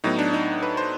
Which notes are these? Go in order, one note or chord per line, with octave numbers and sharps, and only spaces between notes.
A2 F#3 B3 D#4
D4
D#4
B4
C5